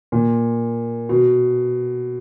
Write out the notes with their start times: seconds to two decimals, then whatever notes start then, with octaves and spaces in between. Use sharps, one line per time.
0.12 A#2
1.09 B2